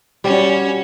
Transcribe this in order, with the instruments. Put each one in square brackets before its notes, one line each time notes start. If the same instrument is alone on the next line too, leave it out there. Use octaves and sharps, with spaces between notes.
[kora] G3 [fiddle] C#4 F#4